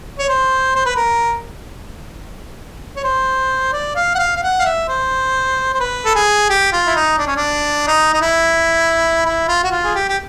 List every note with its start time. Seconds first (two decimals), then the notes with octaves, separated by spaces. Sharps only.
0.19 C#5
0.29 C5
0.75 C5
0.86 B4
0.96 A#4
2.96 C#5
3.04 C5
3.73 D5
3.96 F5
4.15 F#5
4.19 F5
4.36 F5
4.43 F#5
4.60 F5
4.65 E5
4.89 C5
5.74 C5
5.80 B4
6.05 A4
6.15 G#4
6.50 G4
6.73 F4
6.87 E4
6.96 D#4
7.19 D4
7.27 C#4
7.36 D4
7.88 D#4
8.13 D#4
8.22 E4
9.25 E4
9.48 F4
9.64 F#4
9.71 F4
9.84 G#4
9.95 G4
10.08 G4